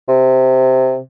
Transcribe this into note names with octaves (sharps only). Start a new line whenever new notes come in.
C3